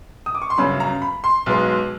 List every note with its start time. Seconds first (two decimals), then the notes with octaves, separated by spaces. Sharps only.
0.26 D#6
0.35 D6
0.42 C#6
0.50 C6
0.58 G1 F#2 C#3 B5
0.80 A#5
1.02 B5
1.24 C6
1.46 B1 B2 G#3